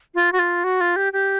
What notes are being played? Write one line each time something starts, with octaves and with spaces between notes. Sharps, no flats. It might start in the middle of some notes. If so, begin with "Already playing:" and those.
F4
F#4
F4
F#4
F4
G4
G4